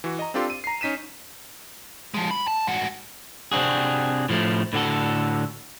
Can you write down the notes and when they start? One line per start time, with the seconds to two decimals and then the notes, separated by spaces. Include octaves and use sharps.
0.04 E3 F#4
0.19 D#5 A#5
0.34 C4 D4 F4 G4 A4 C6
0.50 D#7
0.64 A#5 C7
0.81 C#4 D#4 B6 D#7 E7
2.14 F3 G#3
2.31 B5
2.48 A5
2.67 G#2 F#4
3.52 C3 C4 D4 F#4 G#4
4.29 A2 F3 G#3 A3
4.73 A2 D3 F#4 A4